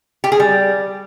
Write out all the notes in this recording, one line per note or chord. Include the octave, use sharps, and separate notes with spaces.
G4
G#4
G3